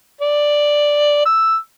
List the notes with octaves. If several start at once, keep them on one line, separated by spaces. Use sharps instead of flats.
D5
E6